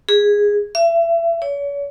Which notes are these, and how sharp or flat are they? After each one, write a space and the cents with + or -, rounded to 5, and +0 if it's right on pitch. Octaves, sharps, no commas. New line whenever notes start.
G#4 -10
E5 +30
C#5 +40